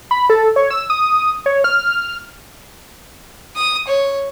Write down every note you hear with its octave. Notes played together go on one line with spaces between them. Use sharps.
B5
A4
C#5
E6
D#6
C#5
F6
D#6
C#5